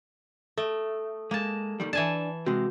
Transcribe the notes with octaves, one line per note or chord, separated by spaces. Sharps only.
A3 A4
G#3 A#3 A5
D#2 D#3 G3
E3 D4 G#5 A5
C3 G#3 F#4